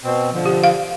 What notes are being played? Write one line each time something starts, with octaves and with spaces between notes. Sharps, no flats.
B2 C4
D3 F3
G4
F5